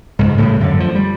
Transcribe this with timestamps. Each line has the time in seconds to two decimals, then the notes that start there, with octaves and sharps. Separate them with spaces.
0.19 C#2 G#2
0.38 A2 C#3 G3
0.61 F#2 D3
0.80 F3
0.95 G3